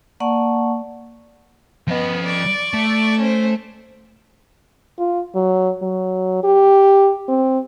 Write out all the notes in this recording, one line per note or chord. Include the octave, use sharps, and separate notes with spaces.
A#3 D5 F#5 A5 C#6
F3 B3 D#5
D5 C#6
A3
C#4 C5
F4
F#3
F#3
G4
C4